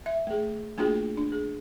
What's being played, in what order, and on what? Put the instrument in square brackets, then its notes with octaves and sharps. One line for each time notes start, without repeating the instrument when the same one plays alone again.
[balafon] E5
A3 G#4
A3 A#3 D4 F4 F#4 G#4
D4
G#4